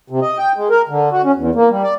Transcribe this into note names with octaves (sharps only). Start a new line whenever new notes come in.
C3
D#5
G5
G#3
A#4
D3
F#4
C#4
E2
A#3
G3
D5